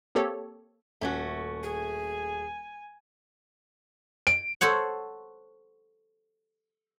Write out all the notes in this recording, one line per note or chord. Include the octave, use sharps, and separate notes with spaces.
A#3 C4 G4 A4 C#5
D#1 A3 C#4 F#4
G#4 G#5
D7
A4 C5 C#5 F#5